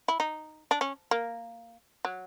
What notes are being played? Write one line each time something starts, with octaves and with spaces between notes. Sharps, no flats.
E4
D#4
D4
C#4
A#3
F#3